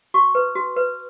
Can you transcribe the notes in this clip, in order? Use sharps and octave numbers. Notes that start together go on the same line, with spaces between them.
F#4 C#6
B4
F#4
B4